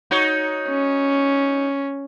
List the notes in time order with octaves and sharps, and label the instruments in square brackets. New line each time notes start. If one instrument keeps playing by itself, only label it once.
[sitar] D#4 F#4 C#5
[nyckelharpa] C#4